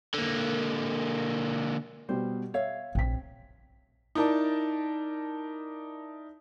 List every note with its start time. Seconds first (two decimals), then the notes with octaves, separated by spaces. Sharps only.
0.14 D3 A#3
2.09 B2 G3 C5
2.54 C#5 E5 F5
2.95 A#1 C4 B6
4.15 D#4 E4 A#4 D5 A5